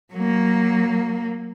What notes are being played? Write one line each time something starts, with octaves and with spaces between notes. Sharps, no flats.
F#3 A#3